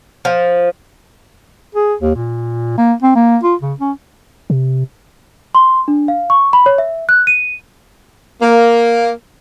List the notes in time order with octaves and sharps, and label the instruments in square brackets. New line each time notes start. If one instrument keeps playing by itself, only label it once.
[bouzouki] F3
[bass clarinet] G#4
D#2
A#2
A#3
C4
A#3
F4
C#3
C#4
[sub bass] C3
[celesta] C6
D4
F5
C#6
B5
C#5
E5
F#6
D#7
[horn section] A#3